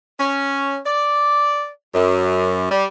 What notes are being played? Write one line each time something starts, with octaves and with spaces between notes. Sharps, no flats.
C#4
D5
F#2
G3